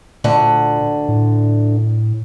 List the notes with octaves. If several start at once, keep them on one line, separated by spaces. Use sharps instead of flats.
D2 A#2 D3 F#5
A2